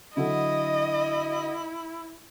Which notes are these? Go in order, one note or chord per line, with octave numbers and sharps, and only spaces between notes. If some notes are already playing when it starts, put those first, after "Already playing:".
D3 F#3 E4 A4 D#5